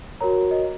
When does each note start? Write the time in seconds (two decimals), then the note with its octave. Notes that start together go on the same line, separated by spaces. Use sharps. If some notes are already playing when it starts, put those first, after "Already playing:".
0.21 F#4 A#4 C#5 A#5
0.51 D#5